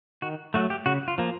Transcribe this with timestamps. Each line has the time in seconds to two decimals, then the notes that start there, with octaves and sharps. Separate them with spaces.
0.22 D#3 F#4
0.54 F#3 A3 F#4
0.70 G4
0.86 C#3 F#4
1.08 F4
1.18 F3 A#3